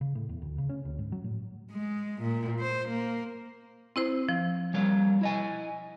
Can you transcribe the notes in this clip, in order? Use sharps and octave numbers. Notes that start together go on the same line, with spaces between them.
C#3
A2
E2
D2
C#3
C#4
D2
G#2
F#3
A2
G#3
A#2
C5
A#3
C4 E4 C5
F3
G3 A#3 C#5
E4 D#5 G#5